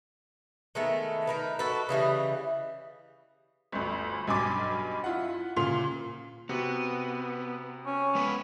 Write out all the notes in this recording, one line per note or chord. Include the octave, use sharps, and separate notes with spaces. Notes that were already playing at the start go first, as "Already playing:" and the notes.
D#3 G#3 A3 B3
D#4 A#4 B4
F#4 A4 B4
C#3 E3 G3 D#5
G1 D2
B1 G2 G#5 C6 D6 A6
E4 F4 F#5
A#2 C#3 F4 C6 F7
C3 B3 F#4
C#4
G#3 B3 B4